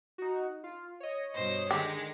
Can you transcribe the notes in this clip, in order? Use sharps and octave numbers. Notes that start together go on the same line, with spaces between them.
D#4 F#4
F4
C#5 D#5
G2 B2 C5
D3 D#3 G#3 G4